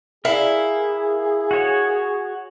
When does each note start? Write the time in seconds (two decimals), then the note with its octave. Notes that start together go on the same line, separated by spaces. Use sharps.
0.25 E4 G#4 A#4 E5 F5
1.51 F#4 C#5